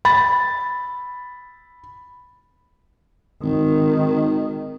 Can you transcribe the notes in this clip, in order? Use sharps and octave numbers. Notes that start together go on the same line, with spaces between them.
B5 A6
G#1 D#3